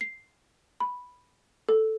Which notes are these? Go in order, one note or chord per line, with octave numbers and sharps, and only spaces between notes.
C7
B5
A4